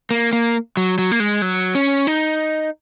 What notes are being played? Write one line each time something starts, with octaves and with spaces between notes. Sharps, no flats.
A#3
A#3
F#3
F#3
A#3
G#3
F#3
C#4
D#4